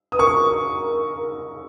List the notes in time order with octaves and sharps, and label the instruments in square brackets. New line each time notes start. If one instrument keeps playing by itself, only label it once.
[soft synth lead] B4 [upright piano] D#6
[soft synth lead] A#4 [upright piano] C#6